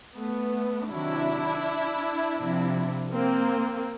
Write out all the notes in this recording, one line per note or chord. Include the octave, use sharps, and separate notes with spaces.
A3 B3
C3 D#3 F#3 D4 E4
C3 F3
A#3 C4